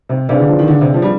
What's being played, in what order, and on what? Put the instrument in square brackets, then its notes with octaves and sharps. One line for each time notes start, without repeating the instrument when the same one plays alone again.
[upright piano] C3
[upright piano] C3 [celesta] D4 G#4 B4 D5 F5
[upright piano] D3
F3
D#3
D3
C3
F3
G3